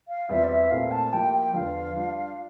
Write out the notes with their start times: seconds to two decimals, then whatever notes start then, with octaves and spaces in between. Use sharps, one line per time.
0.08 F5
0.29 E2 E3 G3 C4 F4 E5
0.44 D5
0.50 E5
0.70 A#2 A3 C4 E4 F5
0.91 A5
1.13 F3 A#3 E4 G4 G5
1.34 G5
1.54 E2 D3 F3 F5
1.96 G3 D4 F4